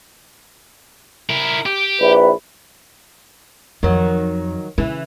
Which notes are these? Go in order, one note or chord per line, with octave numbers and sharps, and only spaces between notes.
E4 A#4
G4
A#1 E4 B4
F2 D#3 F#3
C#3 E3